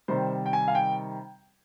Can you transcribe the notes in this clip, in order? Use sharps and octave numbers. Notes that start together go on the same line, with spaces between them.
C3 D#3 G3 C5
G5
G#5
F5
G5